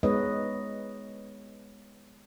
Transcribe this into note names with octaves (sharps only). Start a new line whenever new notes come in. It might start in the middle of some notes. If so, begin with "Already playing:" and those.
G#3 B3 D#4 B4 C#5 D#5